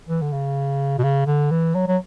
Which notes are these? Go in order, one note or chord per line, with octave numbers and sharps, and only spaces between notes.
E3
D3
C#3
B2
C#3
D3
E3
F#3
F#3